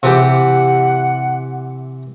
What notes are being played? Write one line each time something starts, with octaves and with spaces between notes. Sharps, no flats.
C3 E3 G4 F#5